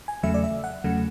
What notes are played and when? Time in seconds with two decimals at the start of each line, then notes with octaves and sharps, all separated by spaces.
0.08 G#5
0.23 E2 C#3 F#3 A3 E5
0.34 D5
0.44 E5
0.64 F#5
0.84 E2 C#3 F#3 A3